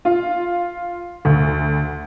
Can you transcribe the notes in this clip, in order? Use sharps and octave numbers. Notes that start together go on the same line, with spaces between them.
F4
D2